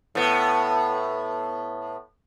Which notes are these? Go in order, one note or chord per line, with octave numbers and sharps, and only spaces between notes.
A2 B3